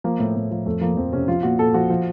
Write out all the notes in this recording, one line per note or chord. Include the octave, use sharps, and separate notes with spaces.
F3 A#3
A2
A2
F3
F2 A3
F3 A#3
F2 C4
C3 C#4
F3 F4
A#2 F#4
A#2 A4
F3 F#4
F3